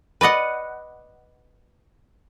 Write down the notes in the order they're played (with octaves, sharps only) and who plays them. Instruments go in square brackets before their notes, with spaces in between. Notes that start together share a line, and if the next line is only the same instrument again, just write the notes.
[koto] B4 D5 D#5 F#5